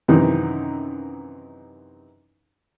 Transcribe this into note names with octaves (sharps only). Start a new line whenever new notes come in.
F#2 C3 D#3 E3 D#4